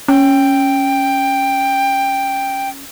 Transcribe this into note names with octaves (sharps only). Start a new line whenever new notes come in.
C#4 G5